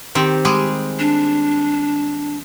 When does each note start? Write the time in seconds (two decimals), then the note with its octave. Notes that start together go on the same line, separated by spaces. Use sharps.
0.15 D#3 C4 G4
0.45 G3 G#3 G#4
0.99 D4